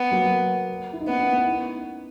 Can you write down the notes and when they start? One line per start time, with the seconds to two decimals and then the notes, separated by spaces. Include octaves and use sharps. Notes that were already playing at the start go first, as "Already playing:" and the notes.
Already playing: B3
0.11 F#3 A#3
0.93 E4
1.00 D#4
1.07 A#3 B3 C#4
1.20 C#4 E4
1.33 B3 D#4
1.45 B3 D#4